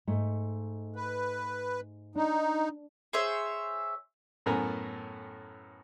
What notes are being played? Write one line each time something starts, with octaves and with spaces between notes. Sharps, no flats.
G#2 A3
B4
D4 D#4
G#4 C5 C#5 E5
F#2 A2 B3 A4 A#4 G#5